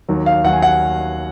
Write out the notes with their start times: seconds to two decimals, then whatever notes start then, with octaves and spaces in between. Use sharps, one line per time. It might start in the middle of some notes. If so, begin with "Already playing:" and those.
0.09 D#2 D#3 F#3
0.26 F5
0.44 D#2 D#3 F#3 F#5
0.53 G#5
0.62 F#5